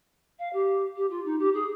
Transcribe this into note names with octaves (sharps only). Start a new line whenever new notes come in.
F5
G4
G4
F4
D#4
G4
G#4